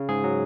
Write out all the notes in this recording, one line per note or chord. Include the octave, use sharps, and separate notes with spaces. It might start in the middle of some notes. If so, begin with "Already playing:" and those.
Already playing: C#3
G#2 G#4
F#3